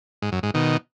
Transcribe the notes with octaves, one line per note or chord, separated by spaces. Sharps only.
G#2
F#2
G#2
B2 D#3